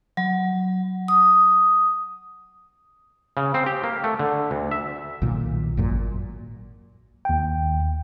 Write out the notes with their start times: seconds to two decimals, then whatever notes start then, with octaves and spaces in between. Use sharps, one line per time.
0.17 F#3
1.08 D#6
3.37 C#3
3.54 C4
3.66 G4
3.84 A#3
4.04 A3
4.19 D3
4.51 D2
4.71 E5
5.22 B1 A#2 D#3
5.77 G#1 F#2 A#2
7.25 D#2 G5